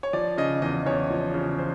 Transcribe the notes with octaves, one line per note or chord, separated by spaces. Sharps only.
C#5
F3 D5
C#3 D#5
E2 D#5
E2 C#5
F3
C#3
C5